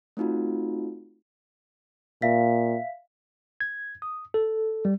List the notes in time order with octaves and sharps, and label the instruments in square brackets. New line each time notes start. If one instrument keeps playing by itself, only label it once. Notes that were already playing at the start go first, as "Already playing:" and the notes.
[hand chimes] A3 C4 D#4 F4 F#4
[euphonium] A#2 [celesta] E5 F5 B6
[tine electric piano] G#6
D#6
A4
G3